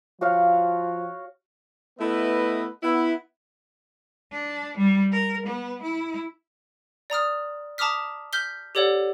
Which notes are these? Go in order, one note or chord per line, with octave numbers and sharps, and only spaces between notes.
F3 F#4 C#5 F5
A3 B3 E4 B4 D#5
B3 E4
D4
G3
A#4
B3
E4
D5 A#5 D#6 F6
A5 A#5 D6 D#6 F6 B6
F6 G6 B6 G7
G4 A4 C#5 D5 F#5